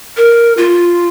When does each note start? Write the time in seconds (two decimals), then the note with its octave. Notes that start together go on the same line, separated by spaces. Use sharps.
0.17 A#4
0.57 F4